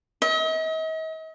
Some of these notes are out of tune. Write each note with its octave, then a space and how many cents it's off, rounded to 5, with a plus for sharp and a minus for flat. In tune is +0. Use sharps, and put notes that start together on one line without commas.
D#5 +45